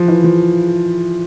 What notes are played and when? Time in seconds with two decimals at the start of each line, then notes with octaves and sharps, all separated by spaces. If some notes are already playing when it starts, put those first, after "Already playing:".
Already playing: F3
0.08 E3
0.24 F3